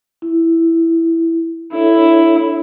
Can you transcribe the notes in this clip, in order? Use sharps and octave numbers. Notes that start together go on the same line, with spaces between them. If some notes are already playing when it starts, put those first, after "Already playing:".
E4
D4 E4 A4 C#5